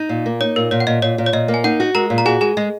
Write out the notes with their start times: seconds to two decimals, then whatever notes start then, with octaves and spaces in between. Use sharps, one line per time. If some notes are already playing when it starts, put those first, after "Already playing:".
Already playing: D#4
0.09 A#2
0.26 A#3
0.41 D#4 C#5
0.56 A#2 A#4
0.71 A#2 C#5
0.80 F#5
0.87 A#2 D#5
1.02 A#2 C#5
1.18 A#2
1.26 C#5
1.33 A#2 D#5
1.48 A#3
1.54 G#5
1.64 D#4 F#5
1.80 F#4
1.95 G#3 A#4 A#5
2.10 A#2
2.18 A#5
2.25 F#4 G#4 G#5
2.41 G#3 G#4 G#5
2.57 G#3 D#5